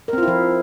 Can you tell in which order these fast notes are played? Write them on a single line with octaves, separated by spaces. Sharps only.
A#4 C4 F4 E4 F3